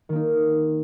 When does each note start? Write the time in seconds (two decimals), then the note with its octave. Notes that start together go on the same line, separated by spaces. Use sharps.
0.09 D#3
0.12 A#3
0.16 D#4